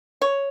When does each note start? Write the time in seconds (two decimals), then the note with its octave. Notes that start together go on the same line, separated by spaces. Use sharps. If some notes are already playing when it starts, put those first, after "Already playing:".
0.22 C#5